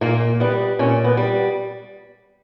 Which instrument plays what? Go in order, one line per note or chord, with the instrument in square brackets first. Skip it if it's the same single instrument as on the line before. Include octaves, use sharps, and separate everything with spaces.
[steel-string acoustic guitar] A#2 A#3
G3 B3
A#2 C#4
B3
G3